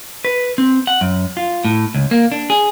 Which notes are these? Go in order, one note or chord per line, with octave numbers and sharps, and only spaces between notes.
B4
C4
F#5
F#2
F4
A2
C#2
A#3
D4
G#4